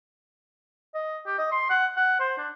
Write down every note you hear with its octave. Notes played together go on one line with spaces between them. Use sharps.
D#5
G4
D#5
C6
F#5
F#5
C5
D4